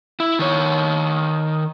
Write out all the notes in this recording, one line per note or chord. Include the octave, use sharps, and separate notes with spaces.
E4
D#3 C#5